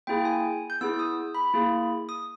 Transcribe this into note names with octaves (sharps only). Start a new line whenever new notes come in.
A#3 E4 G#4 G5
G#5
G6
B3 E4 G#4 E6
D#6
B5
A#3 E4 G#4
D#6